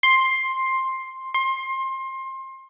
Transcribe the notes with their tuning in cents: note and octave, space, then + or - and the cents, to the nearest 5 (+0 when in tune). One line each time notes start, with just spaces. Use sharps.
C6 +10
C6 +25